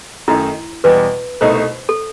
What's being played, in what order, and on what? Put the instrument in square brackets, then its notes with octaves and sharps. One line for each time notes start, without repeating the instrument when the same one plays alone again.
[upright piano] F#2 D#3 A3 D#4 [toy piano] E4
[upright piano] E2 B2 G3 [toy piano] B4
[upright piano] C2 B2 A3 D#4 [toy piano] C5
[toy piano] A4